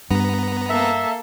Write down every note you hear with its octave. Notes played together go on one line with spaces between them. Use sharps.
G2 B3 A#5
A#3 A4 E5